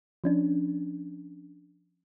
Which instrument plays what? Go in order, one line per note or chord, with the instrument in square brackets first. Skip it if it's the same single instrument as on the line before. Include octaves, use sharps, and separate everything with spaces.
[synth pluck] F3 C#4 D4